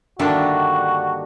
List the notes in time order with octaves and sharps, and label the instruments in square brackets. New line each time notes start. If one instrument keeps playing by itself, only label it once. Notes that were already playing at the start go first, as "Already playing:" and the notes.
[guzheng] G2 D#3 E5 [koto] D3 A#3 D4 [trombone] F#4